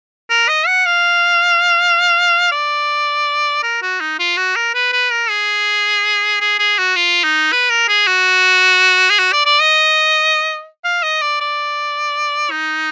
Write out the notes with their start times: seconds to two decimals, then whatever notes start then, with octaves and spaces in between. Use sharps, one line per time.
0.30 A#4
0.48 D#5
0.67 F#5
0.86 F5
2.52 D5
3.63 A#4
3.82 F#4
4.00 D#4
4.19 F4
4.37 F#4
4.56 A#4
4.74 B4
4.93 B4
5.11 A#4
5.30 G#4
6.41 G#4
6.59 G#4
6.78 F#4
6.96 F4
7.24 D#4
7.52 B4
7.70 A#4
7.88 G#4
8.07 F#4
9.10 G#4
9.19 F#4
9.32 D5
9.46 D5
9.60 D#5
10.84 F5
11.03 D#5
11.22 D5
11.40 D5
12.51 D#4